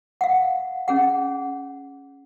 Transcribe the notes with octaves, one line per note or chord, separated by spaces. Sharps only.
F5 F#5
C#4 G#4 F#5